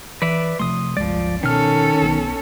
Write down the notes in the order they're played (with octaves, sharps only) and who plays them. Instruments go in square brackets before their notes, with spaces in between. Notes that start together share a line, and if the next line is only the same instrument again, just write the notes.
[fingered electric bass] E3 [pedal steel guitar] B4 D5 E5
[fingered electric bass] C3 F3 A3 [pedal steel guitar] C6 D#6
[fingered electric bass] G1 C#2 G#3 [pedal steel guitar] F3 D5
[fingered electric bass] B2 [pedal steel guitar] D#3 F6 [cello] C#4 A4
[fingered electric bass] B1 E3 B3